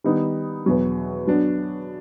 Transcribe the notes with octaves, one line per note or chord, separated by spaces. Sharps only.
D#3 G3 B3 D#4
E2 B2 F#3
F#3 B3 D4